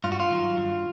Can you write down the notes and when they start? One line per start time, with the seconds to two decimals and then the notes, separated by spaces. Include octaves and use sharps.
0.04 G2 F4
0.12 F#4
0.20 F4
0.31 D#3 F#3
0.57 G2